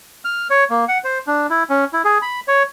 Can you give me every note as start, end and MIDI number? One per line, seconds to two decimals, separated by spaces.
0.25 0.47 89
0.50 0.64 73
0.70 0.85 58
0.88 0.98 78
1.04 1.18 72
1.27 1.47 62
1.50 1.63 64
1.70 1.85 61
1.93 2.02 64
2.04 2.18 68
2.22 2.40 83
2.48 2.63 73